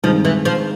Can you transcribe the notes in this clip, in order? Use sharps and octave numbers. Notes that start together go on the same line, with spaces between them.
G2 D#3 F3 G#3 C4 D#4
E3
F3